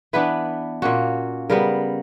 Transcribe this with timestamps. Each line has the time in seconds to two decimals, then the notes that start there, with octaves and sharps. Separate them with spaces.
0.13 E3 B3 D4 B4
0.82 A#2 A#3 C#4 F#4
1.50 C#3 G3 B3 A#4